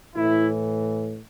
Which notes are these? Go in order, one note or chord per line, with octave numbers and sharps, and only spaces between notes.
A2 E3 E4